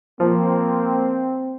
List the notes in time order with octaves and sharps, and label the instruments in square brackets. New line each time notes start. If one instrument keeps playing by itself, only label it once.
[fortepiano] F3 [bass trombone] A#3 [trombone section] C4